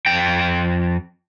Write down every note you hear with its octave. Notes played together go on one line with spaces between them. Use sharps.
F2 G5